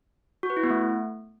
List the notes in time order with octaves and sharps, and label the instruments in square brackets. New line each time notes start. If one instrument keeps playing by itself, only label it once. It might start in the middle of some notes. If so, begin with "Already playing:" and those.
[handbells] F#4
B4
E4
B3
A3